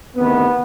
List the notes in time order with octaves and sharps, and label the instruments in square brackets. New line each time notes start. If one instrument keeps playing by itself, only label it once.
[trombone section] D2 C3 D#3 B3